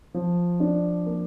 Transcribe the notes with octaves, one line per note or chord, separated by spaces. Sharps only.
F3
D4
A#3